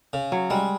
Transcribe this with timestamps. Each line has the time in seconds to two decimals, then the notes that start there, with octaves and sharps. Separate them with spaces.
0.13 C#3
0.32 F#3
0.50 G3 G#3